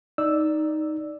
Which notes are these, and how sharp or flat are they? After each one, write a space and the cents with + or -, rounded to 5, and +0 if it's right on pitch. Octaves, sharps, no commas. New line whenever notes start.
D#4 +0 D5 +0 E6 +0